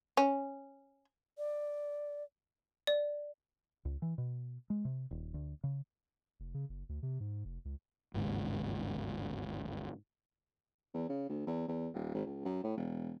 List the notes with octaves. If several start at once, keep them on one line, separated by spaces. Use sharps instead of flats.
C#4
D5
D5
C#2
E3
B2
G#3
C3
D#1
D2
C#3
F1
C#3
F#1
D2
C3
G#2
F1
C#2
G1 D#2 G#2 C#3
E2
C#3
D2
E2
E2
D#1
G#1
C#2
F#2
A2
E1